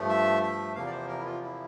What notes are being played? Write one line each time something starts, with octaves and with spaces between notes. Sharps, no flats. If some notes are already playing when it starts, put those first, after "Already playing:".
Already playing: G2 F3 A3
E5
E5
E2 C3 F3 A#3 F5
D5
C5
A#4
E4
F4
E4